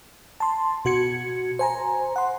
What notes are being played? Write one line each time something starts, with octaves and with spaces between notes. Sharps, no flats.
A5 C6
B2 F#4 G#6 C#7
C5 G#5 A#5
F#5 C6